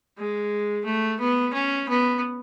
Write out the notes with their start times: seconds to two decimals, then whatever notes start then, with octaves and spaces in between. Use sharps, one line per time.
0.18 G#3
0.85 A3
1.20 B3
1.53 C#4
1.89 B3